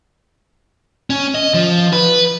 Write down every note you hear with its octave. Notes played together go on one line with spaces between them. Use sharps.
C#4
D#5
F3
B4